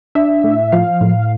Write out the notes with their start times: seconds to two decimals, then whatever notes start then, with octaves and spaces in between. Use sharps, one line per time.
0.15 D4 E5
0.44 A2
0.72 F3 F5
1.01 A2